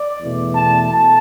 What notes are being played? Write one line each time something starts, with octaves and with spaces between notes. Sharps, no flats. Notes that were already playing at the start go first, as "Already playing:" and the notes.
Already playing: D5
E2 B2 A3
A5
A5